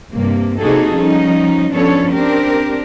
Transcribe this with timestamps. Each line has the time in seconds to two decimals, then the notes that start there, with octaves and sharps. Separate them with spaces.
0.11 G2 C3 A#3
0.59 C3 A#3 D#4 F#4 G#4 A4
0.95 F3 G3 C#4 D#4
1.73 F3 B3 C#4 D4 A4 C#5
2.13 C4 D4 G4 A#4